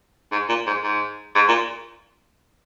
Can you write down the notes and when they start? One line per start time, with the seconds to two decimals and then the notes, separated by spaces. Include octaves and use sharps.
0.32 G#2
0.49 A#2
0.67 G#2
0.83 G#2
1.35 G#2
1.48 A#2